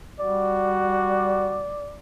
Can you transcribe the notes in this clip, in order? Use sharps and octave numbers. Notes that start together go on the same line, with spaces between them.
G3 F#4 D5